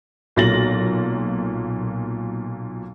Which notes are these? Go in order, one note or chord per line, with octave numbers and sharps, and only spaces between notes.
B1 A#2 A6 A#6 F#7